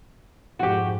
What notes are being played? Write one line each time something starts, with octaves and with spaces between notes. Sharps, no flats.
F2 G#2 F#4 G4